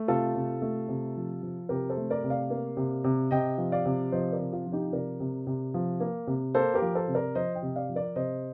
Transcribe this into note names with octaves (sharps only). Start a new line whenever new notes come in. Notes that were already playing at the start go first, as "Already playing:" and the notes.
Already playing: A3
C3 F4 A4
C3
A3
C3
F3
F3
C3 G4 A#4
A4 C5
A3
A#4 D5
C3
D5 F5
A#3
C3
C3
C3 D#5 G5
F3
D5 F5
C3
F3 C5 D#5
A#4 D5
C3
F4
F3
D#4 G4
C3 A#4 D5
C3
C3
F3
A#3
C3
A#3 A4 C5
G4 A#4
F3
A4 C5
C3
A#4 D5
F3 C5 D#5
D#5 G5
C3
D5 F5
F3
A#4 D5
C3 C5 D#5